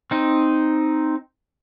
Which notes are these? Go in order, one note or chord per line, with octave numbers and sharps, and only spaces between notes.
C4 D#4